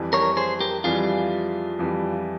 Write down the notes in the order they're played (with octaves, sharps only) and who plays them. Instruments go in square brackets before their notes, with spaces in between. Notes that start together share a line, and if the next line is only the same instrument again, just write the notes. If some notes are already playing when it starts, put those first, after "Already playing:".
Already playing: [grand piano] F2 E3 G3
[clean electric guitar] A#4 C#5
G#4 C5
G4 A#4
[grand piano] F2 E3 G3 [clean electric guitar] F4 G#4
[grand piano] F2 E3 G3